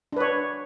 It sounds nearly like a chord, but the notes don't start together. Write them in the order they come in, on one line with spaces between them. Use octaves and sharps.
D4 B4 C#5